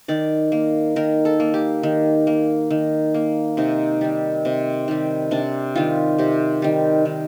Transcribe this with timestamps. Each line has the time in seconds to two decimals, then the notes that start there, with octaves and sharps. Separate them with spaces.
0.08 D#3 D5
0.52 A#3
0.96 D#3 A#4
1.25 A4
1.40 A#3
1.54 G4
1.83 D#3
2.27 A#3
2.71 D#3
3.14 A#3
3.57 C3 D#4
4.01 D#3 G3
4.45 C3
4.88 D#3 G3
5.31 C3 D4
5.75 D#3 G3 F4
6.18 C3 G4
6.62 D#3 G3
7.05 D#3